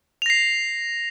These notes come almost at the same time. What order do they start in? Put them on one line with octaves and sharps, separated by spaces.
F7 A#6 C7